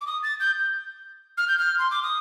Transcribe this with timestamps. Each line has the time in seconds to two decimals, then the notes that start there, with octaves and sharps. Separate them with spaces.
0.01 D6
0.07 D#6
0.23 A6
0.40 G6
1.38 F6
1.48 G6
1.58 F6
1.78 C6
1.91 D6
2.03 D#6